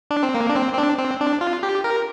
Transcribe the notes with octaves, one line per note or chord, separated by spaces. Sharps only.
D4
C4
A#3
D4
C4
C4
D4
C4
D4
F4
G4
A#4